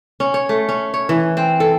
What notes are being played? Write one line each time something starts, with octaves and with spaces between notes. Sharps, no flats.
C#4
C#5
A3
C#4
C#5
E3
C4
A4